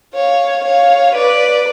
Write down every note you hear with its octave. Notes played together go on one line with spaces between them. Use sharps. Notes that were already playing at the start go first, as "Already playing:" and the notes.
C#5 F5
C#5 F5
B4 D5